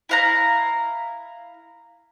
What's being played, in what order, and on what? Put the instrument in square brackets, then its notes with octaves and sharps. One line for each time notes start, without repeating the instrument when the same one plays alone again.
[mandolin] E4 F5 A#5